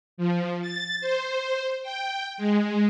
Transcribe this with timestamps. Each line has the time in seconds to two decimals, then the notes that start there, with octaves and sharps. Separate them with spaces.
0.17 F3
0.62 A6
1.01 C5
1.83 G5
2.38 G#3